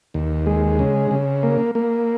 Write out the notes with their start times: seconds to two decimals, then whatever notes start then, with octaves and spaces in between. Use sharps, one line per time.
0.14 D#2
0.46 G#3
0.79 C#3
1.11 C#3
1.43 A#3
1.75 A#3